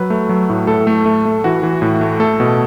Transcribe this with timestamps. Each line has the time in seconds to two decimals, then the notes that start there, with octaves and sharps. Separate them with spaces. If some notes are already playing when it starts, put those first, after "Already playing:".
Already playing: F#3 B4
0.10 A3
0.29 F#3
0.50 A2
0.67 A2 A4
0.87 A3
1.06 A3
1.25 A3
1.44 E3 F#4
1.63 E3
1.82 A2
2.01 A3
2.20 A3 A4
2.40 B2